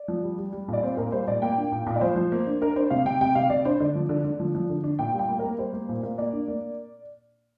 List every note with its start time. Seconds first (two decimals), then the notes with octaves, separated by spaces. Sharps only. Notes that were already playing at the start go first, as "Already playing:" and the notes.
Already playing: D5
0.08 F3
0.23 G3
0.38 G3
0.53 G3
0.68 A#2 D5
0.82 C4 C5
0.97 A#2 A#4
1.12 G3 C5
1.28 A#2 D5
1.42 A#3 G5
1.57 D4
1.72 A#2
1.87 A#2
1.96 D5
2.01 F3 C5
2.16 F3
2.32 A#3
2.47 D4
2.61 D4 A#4
2.76 D4 C5
2.90 C3 F5
3.05 C3 G5
3.21 C3 G5
3.35 C3 F5
3.50 C3 D5
3.65 D4 C5
3.80 D3 D5
3.95 F3
4.09 D3
4.25 D3
4.40 F3
4.55 F3
4.70 D3
4.84 D4
4.99 A#2 G5
5.14 G3
5.19 G5
5.29 A#3
5.39 A#3 A#4
5.58 G3 C5
5.73 A#3
5.89 A#2
6.03 A#3
6.18 A#3 D5
6.33 D4
6.48 A#3